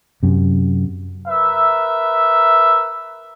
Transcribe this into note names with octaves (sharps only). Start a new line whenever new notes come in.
F#2 C3
A#4 B4 E5